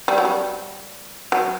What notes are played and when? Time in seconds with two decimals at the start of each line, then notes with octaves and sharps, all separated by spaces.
0.08 G3
0.18 F#3
0.25 G3
1.32 F#3